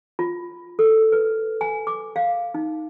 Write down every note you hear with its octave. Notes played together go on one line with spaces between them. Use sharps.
F4
A4
B4
G#5
D6
F5
D#4